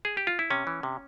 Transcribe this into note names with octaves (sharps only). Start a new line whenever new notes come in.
G#4
G4
F4
E4
C3 C#4
E3
C3